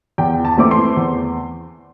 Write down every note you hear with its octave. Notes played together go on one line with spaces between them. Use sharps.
E2 G5
A5
E3 A3 C4 D6
C6
E2